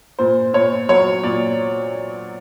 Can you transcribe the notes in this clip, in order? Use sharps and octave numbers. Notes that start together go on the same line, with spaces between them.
A#2 C5
A#2 C#5
F#3 C#5
A#2 D5